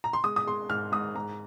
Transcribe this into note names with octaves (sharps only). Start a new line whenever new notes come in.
A#5
C6
G#3 D#6
D#6
G#3 C6
G#2 F6
G#2 D#6
G#2 A#5